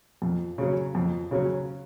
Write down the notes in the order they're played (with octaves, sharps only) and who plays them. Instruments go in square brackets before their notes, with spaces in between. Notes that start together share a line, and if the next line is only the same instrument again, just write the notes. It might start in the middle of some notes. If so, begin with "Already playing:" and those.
[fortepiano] F2
C#3 F#3 C#4
F2
C#3 F#3 C#4